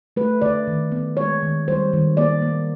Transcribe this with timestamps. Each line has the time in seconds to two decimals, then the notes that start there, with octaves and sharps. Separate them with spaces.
0.17 A3 B4
0.42 D3 D5
0.67 D#3
0.92 B3
1.17 G#3 C#5
1.43 D#3
1.68 G3 C5
1.93 D#3
2.17 A#3 D5
2.42 A#3